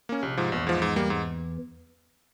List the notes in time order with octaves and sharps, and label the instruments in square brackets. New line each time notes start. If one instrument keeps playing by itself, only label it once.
[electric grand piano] A#3 C#4
[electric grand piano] A#1 [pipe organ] C3
[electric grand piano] G#2 F3
[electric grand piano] A#1 [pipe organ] E2 E3
[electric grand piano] G#2 F3
G#2
G3 A#3
G#2